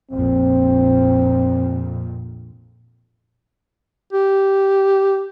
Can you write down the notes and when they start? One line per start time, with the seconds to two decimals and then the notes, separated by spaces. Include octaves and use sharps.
0.11 A#1 F2 A#2 C4
4.13 G4